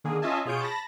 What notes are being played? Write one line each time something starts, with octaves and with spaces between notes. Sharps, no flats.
D3 D#3 A#3 G#4
C#4 F4 D#5 E5 G#5 A5
B2 F4 G#4 C#5 G6 D7
A5 B5 A#6